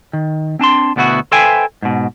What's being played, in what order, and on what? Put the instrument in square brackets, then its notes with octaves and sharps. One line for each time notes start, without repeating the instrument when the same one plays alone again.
[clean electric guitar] D#3
C4 D4 A5 C6
D2 B2 B3 E4 F#4
A4 B4 C5 E5 G5 G#5
G#2 B2